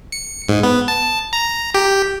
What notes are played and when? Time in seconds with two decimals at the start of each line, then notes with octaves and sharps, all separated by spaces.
0.12 C#7
0.49 G#2
0.63 B3
0.88 A5
1.33 A#5
1.74 G4